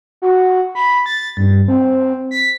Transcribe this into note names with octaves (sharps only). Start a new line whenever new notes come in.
F#4
B5
A6
G2
C4
B6